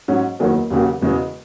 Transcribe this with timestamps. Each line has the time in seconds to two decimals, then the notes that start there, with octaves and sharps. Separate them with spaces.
0.08 G#2 F#3 C#4
0.39 F#1 E2 D#3 F#3
0.70 E1 D#2 C#3 F#3
1.02 E1 E2 C#3 G#3